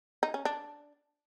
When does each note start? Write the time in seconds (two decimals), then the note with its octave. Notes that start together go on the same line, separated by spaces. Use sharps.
0.23 D#4
0.34 C#4
0.45 D4